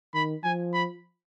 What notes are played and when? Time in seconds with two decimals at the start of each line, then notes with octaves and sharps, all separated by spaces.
0.14 D#3 B5
0.43 F3 G#5
0.74 B5